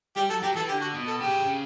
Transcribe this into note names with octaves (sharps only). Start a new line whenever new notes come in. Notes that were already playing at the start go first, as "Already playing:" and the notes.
G3 G4
F#3 A4
F#3 G4
E3 A4
D3 G4
F#4
B2
A4
C#3 G4
C#3